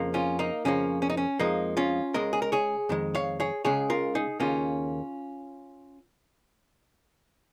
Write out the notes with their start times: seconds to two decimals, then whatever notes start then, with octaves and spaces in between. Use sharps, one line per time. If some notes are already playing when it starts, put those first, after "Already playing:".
Already playing: F2 C#3 F3 A#3
0.14 C#4 F4
0.39 A#3 D#4
0.65 F2 C#3 F3 A#3 C#4
1.02 C#4
1.10 D#4
1.17 C#4
1.39 F2 F3 G#3 A#3 D#4
1.77 C#4 F4
2.14 C#2 C#3 G#3 A#4 D#5
2.33 G#4
2.42 A#4
2.52 G#4 C#5
2.89 F2 D#3 G#3
3.15 C#5 F5
3.40 G#4 C#5
3.65 C#2 C#3 G#3 G#4 C#5
3.90 F4 A#4
4.15 D#4 G#4
4.40 D#2 C#3 A#3 C#4 F4